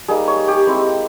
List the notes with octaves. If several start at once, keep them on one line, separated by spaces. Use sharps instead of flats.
G3 A#3 D#4 G#4
C#5
G4
G#3 C4 E4